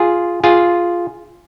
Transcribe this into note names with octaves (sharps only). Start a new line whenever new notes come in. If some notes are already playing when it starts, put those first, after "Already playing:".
Already playing: F4 G#4
F4 G#4